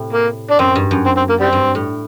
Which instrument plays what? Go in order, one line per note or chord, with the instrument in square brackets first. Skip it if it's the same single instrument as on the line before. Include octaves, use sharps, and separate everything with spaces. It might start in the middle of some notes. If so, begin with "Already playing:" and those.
Already playing: [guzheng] A2 C3
[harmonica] A#3
D4
[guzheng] F#2 [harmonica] C4
[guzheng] G2
F#2
[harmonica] C4
C4
A#3
G3 C4
[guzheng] G2
A2